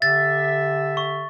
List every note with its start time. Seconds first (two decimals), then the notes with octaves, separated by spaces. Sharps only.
0.02 D3 G4 E5 A6
0.97 C#6